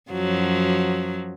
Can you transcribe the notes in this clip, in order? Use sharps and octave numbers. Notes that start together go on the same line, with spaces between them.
F#2 F3 F#3